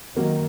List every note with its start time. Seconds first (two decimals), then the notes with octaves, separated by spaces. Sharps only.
0.17 F#2 D#3 F#3 A#3